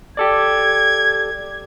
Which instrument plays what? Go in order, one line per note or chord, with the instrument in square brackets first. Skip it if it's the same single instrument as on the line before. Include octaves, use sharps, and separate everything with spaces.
[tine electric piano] G4 A4 D5 [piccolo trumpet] G#6